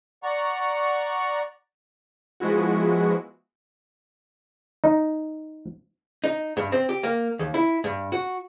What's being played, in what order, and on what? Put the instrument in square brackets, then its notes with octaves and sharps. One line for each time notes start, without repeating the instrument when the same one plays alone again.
[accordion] D5 F#5 A#5 C#6
[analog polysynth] F3 G#3 B3 E4 F#4
[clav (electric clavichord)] D#4
[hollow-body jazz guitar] D#4
G2
C4
G4
A#3
D#2
E4
G2
F#4